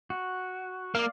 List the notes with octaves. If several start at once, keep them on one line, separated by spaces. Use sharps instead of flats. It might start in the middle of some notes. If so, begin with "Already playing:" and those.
F#4
A#3 D5 F5